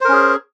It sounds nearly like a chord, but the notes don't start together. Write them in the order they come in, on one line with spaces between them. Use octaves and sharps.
C5 A#4 C#4 G#4